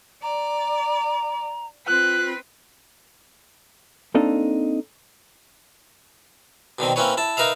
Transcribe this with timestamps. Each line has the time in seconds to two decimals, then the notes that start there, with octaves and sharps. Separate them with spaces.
0.22 D5 A#5
1.87 C4 F4 B4 F#6
4.14 A#3 C4 D4 D#4 A4 F5
6.79 B2 D3 D#3 C4
6.96 A#3 C4 C#4 E4 B4 C#5
7.17 E4 A5
7.37 D#4 A#4 B4 E5 F5